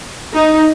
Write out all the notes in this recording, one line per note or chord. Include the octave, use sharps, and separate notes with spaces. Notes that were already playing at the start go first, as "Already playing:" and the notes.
D#4